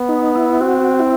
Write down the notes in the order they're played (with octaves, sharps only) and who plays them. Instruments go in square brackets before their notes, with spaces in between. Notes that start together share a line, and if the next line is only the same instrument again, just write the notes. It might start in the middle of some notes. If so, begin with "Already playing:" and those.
Already playing: [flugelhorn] B3
[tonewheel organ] D#4
E4
[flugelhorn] C4 [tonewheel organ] F#4
[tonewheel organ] E4